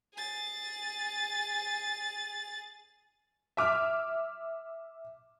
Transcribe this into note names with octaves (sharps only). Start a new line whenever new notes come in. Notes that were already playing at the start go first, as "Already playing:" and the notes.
G#4 A6
E5 D6 F6